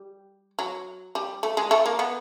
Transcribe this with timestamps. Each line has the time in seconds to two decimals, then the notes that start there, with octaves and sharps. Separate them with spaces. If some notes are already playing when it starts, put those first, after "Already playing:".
Already playing: G3
0.59 F#3
1.15 G3
1.43 A3
1.57 G#3
1.71 A3
1.86 A#3
1.99 B3